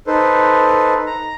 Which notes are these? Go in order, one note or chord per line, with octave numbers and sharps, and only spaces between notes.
D#4 A4 B4 C5
A#5